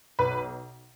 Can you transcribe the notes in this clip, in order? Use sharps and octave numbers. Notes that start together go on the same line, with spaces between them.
B1 B4